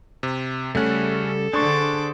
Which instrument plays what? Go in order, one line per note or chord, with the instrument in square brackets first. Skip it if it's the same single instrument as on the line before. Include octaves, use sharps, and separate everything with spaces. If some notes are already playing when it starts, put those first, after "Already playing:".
[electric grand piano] C3
[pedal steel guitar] C#3 G3 F#5 [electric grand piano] A3 C#4 [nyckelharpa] A4
[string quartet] D3 D6 A6 [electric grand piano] D4 [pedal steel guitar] G#4 C5 C#6